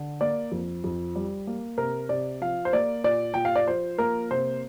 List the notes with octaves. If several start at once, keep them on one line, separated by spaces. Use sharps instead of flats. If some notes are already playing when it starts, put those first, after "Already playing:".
Already playing: D3
A#3 D5
F2
F2
G3
A#3
C3 A#4
C3 D5
F3 F5
C5
A#3 D5
A#2 D5
A#2 G5
F5
D5
F3 C5
A#3 A#4
C3 C5